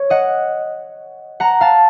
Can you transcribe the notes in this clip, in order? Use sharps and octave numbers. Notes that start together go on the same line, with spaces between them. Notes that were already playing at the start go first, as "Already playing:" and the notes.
Already playing: C#5
D#5 F#5
F#5 A#5
F5 A5